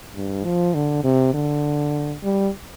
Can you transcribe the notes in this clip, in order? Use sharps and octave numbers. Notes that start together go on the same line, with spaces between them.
G2
F3
D3
C3
D3
G3